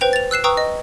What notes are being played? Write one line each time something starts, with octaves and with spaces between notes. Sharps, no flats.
B4 C5 G5 F7
A6 F7
E6 F#6 C7 E7
B4 G5 A#5 C#6 D#6 E6
D#5